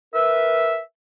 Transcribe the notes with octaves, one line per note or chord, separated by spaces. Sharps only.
A#4 B4 E5